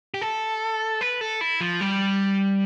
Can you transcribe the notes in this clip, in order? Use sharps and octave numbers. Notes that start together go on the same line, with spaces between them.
G4
A4
B4
A4
E4
F3
G3